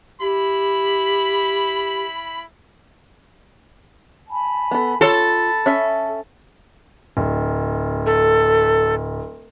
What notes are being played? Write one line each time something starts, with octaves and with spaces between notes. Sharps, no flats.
E4 G4 B5
G#5 A5 B5
B3 A4
F4 A4 C#5 B5
C#4 E5 A5
D1
A4